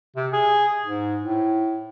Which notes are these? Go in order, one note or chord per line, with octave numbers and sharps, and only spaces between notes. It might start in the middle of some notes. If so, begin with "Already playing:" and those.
C3
G#4
G#2
A2